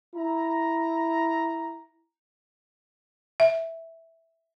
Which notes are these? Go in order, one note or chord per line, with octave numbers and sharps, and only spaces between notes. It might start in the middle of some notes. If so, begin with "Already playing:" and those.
E4 A#5
E5